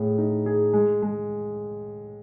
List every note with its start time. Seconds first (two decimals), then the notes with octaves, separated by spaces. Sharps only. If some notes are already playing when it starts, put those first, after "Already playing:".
Already playing: A2 G#4
0.18 D#4
0.46 G#4
0.73 G#3
1.02 G#3